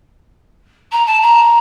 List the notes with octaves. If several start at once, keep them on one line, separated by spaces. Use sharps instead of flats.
A#5
A5
A#5